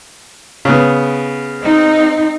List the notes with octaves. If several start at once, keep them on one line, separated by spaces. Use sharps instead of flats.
C#3 B3
C4 D#4